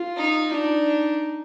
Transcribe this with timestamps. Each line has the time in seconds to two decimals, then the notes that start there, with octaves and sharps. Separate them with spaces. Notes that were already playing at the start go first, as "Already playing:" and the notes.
Already playing: F4
0.17 D#4
0.51 D4 D#4